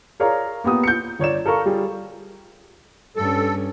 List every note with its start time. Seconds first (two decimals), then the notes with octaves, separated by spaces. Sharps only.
0.20 G#4 A#4 C#5 D5 F5 A#5
0.64 A#3 B3 G4 D#6
0.84 G6 C#7
1.19 G1 C#5 D5 E7
1.46 A4 A#4 F5 C#6
1.66 G3 F4 G#4
3.16 G2 C#4 A4